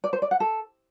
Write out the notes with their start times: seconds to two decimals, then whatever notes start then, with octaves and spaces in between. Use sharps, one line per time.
0.04 D5
0.13 C5
0.22 D5
0.31 F#5
0.40 A4